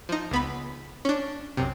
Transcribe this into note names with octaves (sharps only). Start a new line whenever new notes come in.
F3 D#4
C#2 B3 B5
C#4 D4
B1 F#2 C3